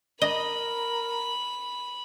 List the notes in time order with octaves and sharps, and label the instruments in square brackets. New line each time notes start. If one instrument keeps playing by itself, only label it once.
[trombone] A#4 [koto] D#5 [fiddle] B5